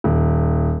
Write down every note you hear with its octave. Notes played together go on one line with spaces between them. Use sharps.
D#1